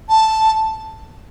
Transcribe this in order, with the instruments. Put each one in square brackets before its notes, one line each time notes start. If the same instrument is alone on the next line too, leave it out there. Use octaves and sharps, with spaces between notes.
[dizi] A5